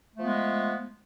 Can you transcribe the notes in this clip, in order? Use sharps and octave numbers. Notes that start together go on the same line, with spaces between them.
F3 G#3 A3 B3